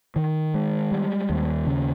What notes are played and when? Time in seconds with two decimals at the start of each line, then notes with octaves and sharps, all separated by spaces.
0.16 D#3
0.54 G#3
0.92 G3
1.30 D#2
1.67 C#3